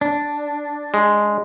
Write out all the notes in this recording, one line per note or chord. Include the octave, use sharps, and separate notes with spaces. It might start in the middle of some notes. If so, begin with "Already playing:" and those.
D4
G#3